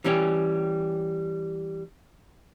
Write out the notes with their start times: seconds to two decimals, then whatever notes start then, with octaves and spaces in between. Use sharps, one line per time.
0.04 E3 G3 C#4 G4